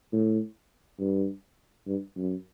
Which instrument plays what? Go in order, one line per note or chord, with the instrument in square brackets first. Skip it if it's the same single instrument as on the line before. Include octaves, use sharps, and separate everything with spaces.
[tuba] A2
G2
G2
F#2